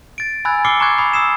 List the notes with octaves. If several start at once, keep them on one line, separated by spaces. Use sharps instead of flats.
A6 D7
G#5 B5 E6 F#6 G#6 A6
D6 E6 F6 C7 C#7 G7
A#5 C#6 D6 F#6 G#6 C7
B5 D#6 G#6
D#6 E6 C7 E7